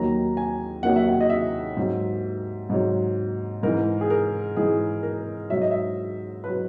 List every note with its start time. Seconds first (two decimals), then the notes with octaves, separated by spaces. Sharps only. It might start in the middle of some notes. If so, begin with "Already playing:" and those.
Already playing: D#2 D#3 F#3 A#5
0.37 G#5
0.83 D#2 D#3 F#3 F#5
0.96 E5
1.09 F#5
1.21 D#5
1.30 E5
1.77 G#2 F#3
2.70 G#2 F#3
3.63 G#2 E3 A#4
4.01 G#4
4.10 A#4
4.56 G#2 E3 G#4
5.03 A#4
5.50 G#2 F#3 E5
5.61 D#5
5.71 E5
6.44 F#3 B4